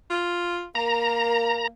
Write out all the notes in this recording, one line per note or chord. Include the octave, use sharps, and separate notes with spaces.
F4
A#3 A#4 A#5